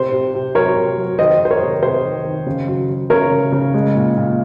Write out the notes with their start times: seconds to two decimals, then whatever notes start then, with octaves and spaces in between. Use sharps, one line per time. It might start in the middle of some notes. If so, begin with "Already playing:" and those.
Already playing: C3 C5
0.12 C3
0.34 C3
0.55 F#3 A#4 C#5
0.76 C3
0.98 F#3
1.19 D#3 C5 D#5
1.40 D#3
1.45 C5
1.51 A#4 C#5
1.61 C3
1.82 C3 C5
2.04 D#3
2.25 D#3
2.46 C#3
2.67 F#3
2.89 F#3
3.10 C#3 A#4 C#5
3.31 C#3
3.52 C#3
3.74 G#3
3.95 A#2
4.17 A#2